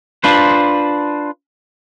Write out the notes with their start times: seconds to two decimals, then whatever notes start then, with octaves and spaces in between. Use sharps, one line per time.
0.24 D4 F4 B4 C5